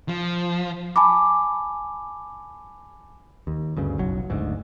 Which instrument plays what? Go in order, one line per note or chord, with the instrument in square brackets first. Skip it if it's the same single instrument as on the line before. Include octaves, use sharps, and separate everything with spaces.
[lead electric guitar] F3
[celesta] G#5 A5 B5 D6
[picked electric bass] D#2
D2 G2 C#3
F#1 B1 F#3
F#1 D2 G#2